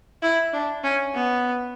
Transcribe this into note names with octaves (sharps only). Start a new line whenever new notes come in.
E4
D4
C#4
B3